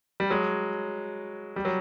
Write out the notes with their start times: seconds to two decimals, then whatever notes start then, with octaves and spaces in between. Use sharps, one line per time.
0.20 G3
0.30 F#3 G#3
1.56 G3
1.65 F#3